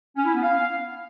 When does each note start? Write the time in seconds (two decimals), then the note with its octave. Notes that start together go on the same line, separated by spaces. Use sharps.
0.16 C#4
0.25 E4
0.34 B3
0.42 F5